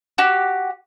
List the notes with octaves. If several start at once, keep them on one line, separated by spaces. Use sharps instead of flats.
F#4 G4